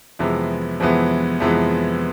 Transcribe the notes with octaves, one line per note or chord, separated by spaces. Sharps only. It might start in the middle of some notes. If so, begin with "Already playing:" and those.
F2 C3 E3 G#3 B3
F2 C3 E3 G#3 B3
F2 C3 E3 G#3 B3